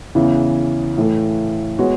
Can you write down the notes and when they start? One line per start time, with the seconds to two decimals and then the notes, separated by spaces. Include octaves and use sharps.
0.15 E2 C#3 E3
0.98 A2 E3 A3
1.79 G#3 B3 F#4 C#5